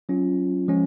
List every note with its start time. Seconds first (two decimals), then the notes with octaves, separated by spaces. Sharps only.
0.09 F#3 C#4 F4
0.68 F3 G#3 C#4